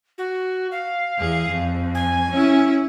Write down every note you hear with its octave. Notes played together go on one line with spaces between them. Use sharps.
F#4
F5
E2 G#4
F2
G#5
C#4 E4